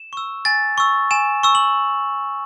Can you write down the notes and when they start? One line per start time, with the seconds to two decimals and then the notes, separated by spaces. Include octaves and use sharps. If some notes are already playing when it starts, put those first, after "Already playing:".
Already playing: E7
0.13 C#6 E6
0.45 G#5 A6
0.78 C#6 E6
1.11 G#5 E7
1.43 C#6 E6
1.55 F#7